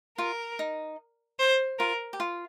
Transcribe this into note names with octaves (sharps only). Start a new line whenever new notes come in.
F4 A#4
D#4
C5
F4 A#4
G4
F4